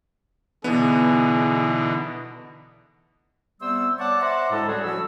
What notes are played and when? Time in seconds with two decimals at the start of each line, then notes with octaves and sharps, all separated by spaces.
0.64 B2 D3 E3 B3 D#4 G#4
3.61 C3 G3 B3 C5 E6
3.99 C#5 D5 F#5 A5 C#6 D6
4.21 C5 E5 F#5 A#5 C6 D6
4.50 D2 A2 G#3 A4 A5 B5
4.68 F#3 G3 C#4 F#4 G#4 A4
4.84 D2 F3 F#4 B5 E6